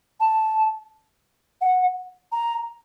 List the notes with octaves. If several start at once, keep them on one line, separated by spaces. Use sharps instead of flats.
A5
F#5
A#5